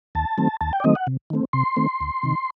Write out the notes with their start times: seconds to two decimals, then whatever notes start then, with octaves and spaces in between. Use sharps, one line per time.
0.15 D#2 A5
0.38 D#3 F#3 A3 C4
0.61 D#2 A5
0.73 G5
0.80 D5
0.84 D#3 F#3 A3 C4 D#5
0.95 F#5
1.07 C3
1.30 D#3 A3 C4
1.53 C3 C6
1.76 D#3 A3 C4
2.01 D2
2.23 C3 D#3